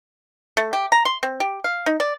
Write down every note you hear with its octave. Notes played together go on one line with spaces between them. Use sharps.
A3
G4
A#5
C6
C4
G4
F5
D#4
D5